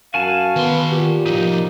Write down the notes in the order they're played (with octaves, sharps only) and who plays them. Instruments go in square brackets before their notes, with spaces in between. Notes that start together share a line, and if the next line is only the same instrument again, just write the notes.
[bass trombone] F#2 [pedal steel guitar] F#4 G#5 A5 [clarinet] F5
[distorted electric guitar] D#3 C6 [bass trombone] B3
[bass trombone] A#2 [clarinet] G4
[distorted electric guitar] A2 F3 [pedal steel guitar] D#4